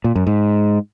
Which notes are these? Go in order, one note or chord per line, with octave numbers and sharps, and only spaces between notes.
A#2
F#2
G#2